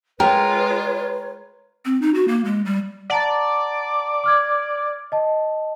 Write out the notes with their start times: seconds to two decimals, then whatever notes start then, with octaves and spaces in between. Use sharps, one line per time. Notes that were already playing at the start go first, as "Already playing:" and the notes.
0.20 G#3 F4 A#4 B4 C#5 G5
1.85 C4
2.02 D#4
2.14 F#4
2.28 A#3
2.45 G#3
2.65 G3
3.10 D5 F#5 A5 A#5
4.24 D6 F6 G#6
5.12 D#5 A5